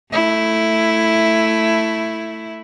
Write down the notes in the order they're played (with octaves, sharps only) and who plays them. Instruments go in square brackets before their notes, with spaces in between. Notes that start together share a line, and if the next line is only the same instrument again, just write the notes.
[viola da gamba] A3 E4